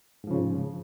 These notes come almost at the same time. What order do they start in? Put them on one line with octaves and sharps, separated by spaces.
G#2 F3 C#3